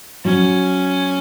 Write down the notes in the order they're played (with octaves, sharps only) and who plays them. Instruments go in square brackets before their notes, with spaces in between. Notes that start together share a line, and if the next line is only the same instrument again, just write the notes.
[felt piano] F#3 [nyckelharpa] C#4